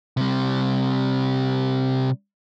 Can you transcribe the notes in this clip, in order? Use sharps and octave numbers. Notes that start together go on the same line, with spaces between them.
C3 G3